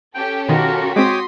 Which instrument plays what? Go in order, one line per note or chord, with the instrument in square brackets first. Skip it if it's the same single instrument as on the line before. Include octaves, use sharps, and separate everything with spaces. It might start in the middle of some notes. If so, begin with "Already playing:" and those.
[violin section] C#4 G4 A4 [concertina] G5
[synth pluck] B2 D#3 [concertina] F4 A#4 [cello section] F#4
[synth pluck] G#3 C4 [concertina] C#5 G5 D6 [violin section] C6 D#6 B6